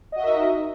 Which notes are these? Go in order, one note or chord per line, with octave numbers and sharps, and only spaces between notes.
D#4 F#4 A#4 D#5 E5